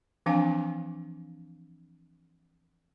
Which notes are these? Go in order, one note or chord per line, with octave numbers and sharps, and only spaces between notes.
E3 F3 C4 D4 F5 G#5